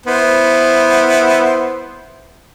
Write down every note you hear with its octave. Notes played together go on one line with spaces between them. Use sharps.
B3 E4 C5